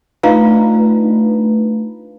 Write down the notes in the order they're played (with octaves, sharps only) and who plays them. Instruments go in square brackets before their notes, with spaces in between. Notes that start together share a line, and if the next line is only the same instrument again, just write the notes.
[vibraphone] A3 [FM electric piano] D4 D#4 B4 [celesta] F4 F5 A#5